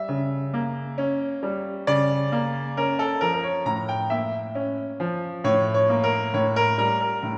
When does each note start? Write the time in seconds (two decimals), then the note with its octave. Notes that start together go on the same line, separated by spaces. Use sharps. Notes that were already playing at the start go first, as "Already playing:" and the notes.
Already playing: G3 E5
0.09 C#3
0.54 A#3
0.98 C#4
1.43 G3
1.87 C#3 D5
2.32 A#3
2.77 C#4 A#4
2.99 A4
3.21 F3 A#4
3.33 A#4
3.43 C#5
3.66 A2 A#5
3.89 G5
4.10 A#3 E5
4.55 C#4
5.00 F3
5.44 A2 C#5
5.74 C#5
5.90 A#3
6.04 A#4
6.34 A2 C#5
6.56 A#4
6.78 G3 A#4
7.01 A#4
7.23 A2